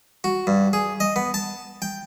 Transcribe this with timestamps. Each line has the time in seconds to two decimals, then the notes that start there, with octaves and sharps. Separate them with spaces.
0.24 F#4
0.47 G2
0.73 G#4
1.00 D#5
1.16 B3
1.34 A5
1.82 G5